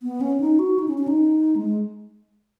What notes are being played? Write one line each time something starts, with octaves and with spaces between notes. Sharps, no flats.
B3
C#4
D#4
F#4
D#4
C#4
C#4
D#4
G#3